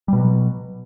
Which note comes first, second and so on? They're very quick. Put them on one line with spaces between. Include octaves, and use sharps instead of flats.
G3 B2 F#3